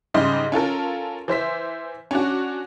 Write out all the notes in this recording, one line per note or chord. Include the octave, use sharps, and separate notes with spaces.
G#2 C#3 G3 G4 D#5 C6
C#4 F4 A4 A#4
E3 C5 E5 B6
C#4 D4 F#4